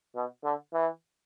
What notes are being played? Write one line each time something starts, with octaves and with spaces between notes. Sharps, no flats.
B2
D3
E3